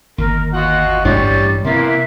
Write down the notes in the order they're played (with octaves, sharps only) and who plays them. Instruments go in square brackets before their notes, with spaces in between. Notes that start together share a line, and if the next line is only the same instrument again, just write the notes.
[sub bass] G1 [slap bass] D#2 [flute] A#4
[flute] F4 [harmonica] F#4 D#5 F#5
[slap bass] A1 G2 D4 [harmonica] G3 C#5 [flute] A6
[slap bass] C3 B3 [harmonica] E3 A#3 C6 [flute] E5